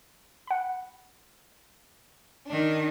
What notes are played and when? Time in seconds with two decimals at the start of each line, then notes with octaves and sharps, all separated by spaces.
0.47 F#5 B5
2.46 D#3 D4